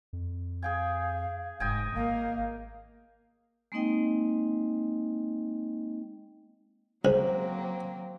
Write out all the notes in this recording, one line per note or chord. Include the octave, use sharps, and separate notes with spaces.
F2
G#4 F5 G5 G#5
F1 G#2 D#5 G5 G#5
G#1 A#3 F5
G#3 A#3 C4 D#4 D#5 G5
C#2 F#3 A#3 C4 C5